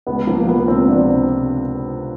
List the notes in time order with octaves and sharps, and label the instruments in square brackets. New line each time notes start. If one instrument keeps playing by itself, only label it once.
[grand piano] C#2 B3
F3 A#3
F3 B3
C#2 C4
C3 D4